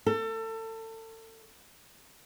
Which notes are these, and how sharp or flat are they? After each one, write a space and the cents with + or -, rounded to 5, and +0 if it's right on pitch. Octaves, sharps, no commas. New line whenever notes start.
A4 +30